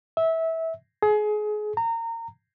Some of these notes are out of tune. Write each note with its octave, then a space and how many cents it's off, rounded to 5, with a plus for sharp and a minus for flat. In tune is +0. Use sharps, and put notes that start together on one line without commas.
E5 -20
G#4 +30
A#5 -25